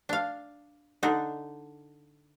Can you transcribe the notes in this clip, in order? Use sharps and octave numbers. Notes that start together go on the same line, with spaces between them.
D4 F5
D3 D4 D#4